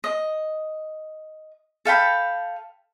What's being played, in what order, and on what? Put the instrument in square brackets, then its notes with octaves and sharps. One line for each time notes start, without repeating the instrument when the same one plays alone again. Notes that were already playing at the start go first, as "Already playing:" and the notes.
[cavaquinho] D#5
A4 F5 G5 B5